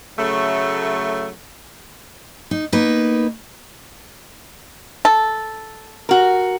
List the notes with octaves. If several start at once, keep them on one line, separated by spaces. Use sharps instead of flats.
C#3 F#3 A3
D#4
A#3 B3 D#4 B4
A4
F#4 A#4